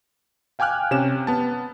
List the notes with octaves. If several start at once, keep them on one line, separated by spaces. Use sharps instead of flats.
F5 G5 G#5 D6 F6 F#6
C3 C#4 E7
B3 A5